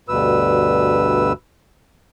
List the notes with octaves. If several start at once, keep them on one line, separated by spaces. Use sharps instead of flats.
D2 G2 B2 B4 E6